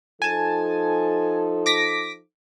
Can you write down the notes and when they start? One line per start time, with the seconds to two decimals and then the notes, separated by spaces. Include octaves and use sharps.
0.22 F3 D#4 A4 G#5 A5
1.66 D6 A#6 B6